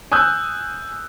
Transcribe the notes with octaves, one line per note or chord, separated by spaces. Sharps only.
G#5 D#6 E6 F#6 G6